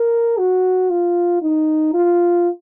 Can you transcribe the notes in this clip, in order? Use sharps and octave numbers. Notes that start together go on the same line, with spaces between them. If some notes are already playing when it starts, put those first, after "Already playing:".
Already playing: A#4
F#4
F4
D#4
F4